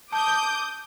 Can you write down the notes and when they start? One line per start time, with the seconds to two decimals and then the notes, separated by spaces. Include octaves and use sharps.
0.12 A5 D6 D#6 G6